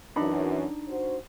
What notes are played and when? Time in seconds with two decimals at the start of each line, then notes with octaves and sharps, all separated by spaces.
0.16 F#2 E3 D4 D#4 B5
0.88 F#4 C5